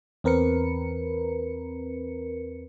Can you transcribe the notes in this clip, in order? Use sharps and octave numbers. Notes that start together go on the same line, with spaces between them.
E2 C4 A#4 B4 C#7